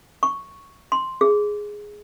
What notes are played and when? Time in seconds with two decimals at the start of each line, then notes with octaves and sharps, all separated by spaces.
0.23 C#6
0.92 C6
1.21 G#4